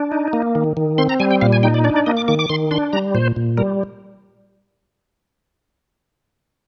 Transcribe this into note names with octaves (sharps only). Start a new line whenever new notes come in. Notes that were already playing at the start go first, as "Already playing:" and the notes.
Already playing: D4
D#4
A#3
D#3
D#3
C4 C6
A#5
G3 G#5
G5
A#2 F5
G#5
D#4 G5
D5
D4 D5
D5
A#3 D#5
D6
D#3 D6
D6
D#3 C6
D4 C6
G3 A#5
A#2 C5
A#2
G3 A#4